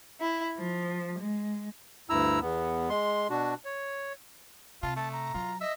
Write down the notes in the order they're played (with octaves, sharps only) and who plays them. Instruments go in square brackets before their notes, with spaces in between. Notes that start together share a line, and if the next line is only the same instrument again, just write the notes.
[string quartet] E4
F3
G#3
[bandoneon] D2 G2 E4 A#5 E6
E2 B3
G#3 C6
B2 D4 F#4
C#5
[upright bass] C3 [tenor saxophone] F4 [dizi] A5
[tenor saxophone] A3 [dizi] A5
[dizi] A#5
[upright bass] F#3 [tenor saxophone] F4
[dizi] D#5 [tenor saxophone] E5